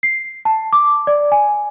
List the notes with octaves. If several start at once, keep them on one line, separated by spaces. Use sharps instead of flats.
C7
A5
D6
D5
G#5